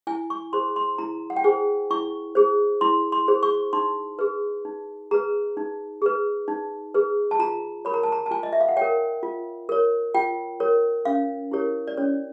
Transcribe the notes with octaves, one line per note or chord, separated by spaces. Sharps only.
E4 G#5
C#6
G#4 C5 C6
C6
E4 A#5
F#5
G5
G#4 C5 G#5
E4 C#6
G#4 C5
E4 C6
C6
G#4 C5
C#6
D#4 C6
G#4 B4
D#4
G#4 B4 A#5
D#4
G#4 B4
D#4
G#4 B4
A5
F4 A#5
A#4 C#5 B5
A#5
A5
A#5
A5
F4 G#5
D#5
E5
F5
F#5
A#4 C#5 G5
F4
A#4 C#5
F4 G5
A#4 C#5
C#4 F5
E4 G4 A#4 C#5
D5
C#4 C#5